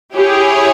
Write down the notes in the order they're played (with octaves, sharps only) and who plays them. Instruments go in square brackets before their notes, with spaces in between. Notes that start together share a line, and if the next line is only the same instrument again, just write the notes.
[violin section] E4 G#4 C#5 [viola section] G4